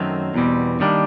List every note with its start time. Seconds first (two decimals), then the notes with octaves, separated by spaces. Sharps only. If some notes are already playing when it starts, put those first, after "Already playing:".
Already playing: F#2 D#3 F#3 A3 C4
0.34 E2 B2 G3 C4
0.80 D#3 G3 A#3 D4